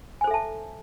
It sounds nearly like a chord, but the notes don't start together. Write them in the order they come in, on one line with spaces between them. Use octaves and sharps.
G#5 C5 A4 E5 A5